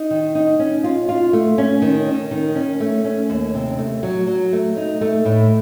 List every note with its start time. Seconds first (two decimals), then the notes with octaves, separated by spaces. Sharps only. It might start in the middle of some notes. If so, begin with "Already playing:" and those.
Already playing: D#4
0.11 D#3
0.35 D#4
0.59 C#4
0.84 F4
1.09 F4
1.33 A3
1.58 C#4
1.82 D#3
2.07 C#4
2.31 D#3
2.55 C#4
2.80 A3
3.05 C#4
3.30 D#2
3.54 C3
3.78 A3
4.03 F#3
4.27 F#3
4.53 A3
4.77 D#4
5.01 A3
5.25 A2